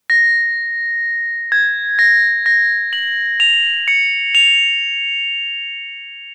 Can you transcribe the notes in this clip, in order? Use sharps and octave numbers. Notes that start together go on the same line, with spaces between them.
A#6
G#6
A#6
A#6
F#7
F7
C#7
F7